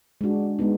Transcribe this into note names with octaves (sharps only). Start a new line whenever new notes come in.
G#3 D4 F#4
G#3 B3 D#4